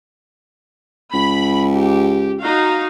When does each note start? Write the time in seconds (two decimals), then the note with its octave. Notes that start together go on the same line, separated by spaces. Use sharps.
1.14 C#2 B5
1.74 G4
2.40 D#4 F#4 F5